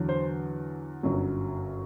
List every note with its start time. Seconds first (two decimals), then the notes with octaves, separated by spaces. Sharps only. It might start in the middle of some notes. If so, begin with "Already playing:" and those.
Already playing: E2 D3 F#3
0.09 C5
1.03 G1 F#2 F#3